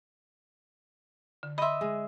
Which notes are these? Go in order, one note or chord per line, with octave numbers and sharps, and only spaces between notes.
D3
D#5 E5 B5 C6
G#3